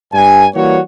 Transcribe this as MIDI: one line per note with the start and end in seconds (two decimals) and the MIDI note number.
0.13 0.47 43
0.13 0.47 80
0.55 0.80 52
0.55 0.80 55
0.55 0.80 58
0.55 0.80 66
0.55 0.80 73